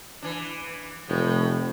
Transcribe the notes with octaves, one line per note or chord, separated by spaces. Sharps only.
E3 D4
F1 A2